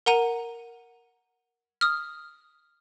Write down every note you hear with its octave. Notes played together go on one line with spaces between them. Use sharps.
A#4 F#5 A#5 D#7
D#6 F6